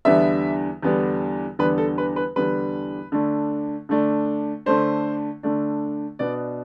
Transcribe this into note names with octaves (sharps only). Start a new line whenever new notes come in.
E2 D3 G3 B3 D4 E5
E2 D3 G3 B3 D4
E2 D3 G3 B3 D4 B4
A4
B4
B4
E2 D3 G3 B3 D4 B4
D3 A3 D4
D3 A3 D4
D3 A3 D4 C5
D3 A3 D4
B2 B3 D4 D5